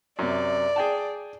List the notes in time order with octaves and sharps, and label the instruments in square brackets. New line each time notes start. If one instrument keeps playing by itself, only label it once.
[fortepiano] F#2 C3 [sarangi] D5
[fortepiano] G#4 G5 A5